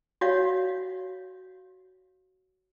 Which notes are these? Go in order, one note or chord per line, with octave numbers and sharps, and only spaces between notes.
F#4 C#5 F5